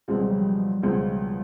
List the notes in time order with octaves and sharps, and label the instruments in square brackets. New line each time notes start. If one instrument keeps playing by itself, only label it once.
[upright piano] C#2 B2 G#3 C4 [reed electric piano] G3
[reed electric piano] F#3
F3 G3
[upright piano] C#2 B2 G#3 C4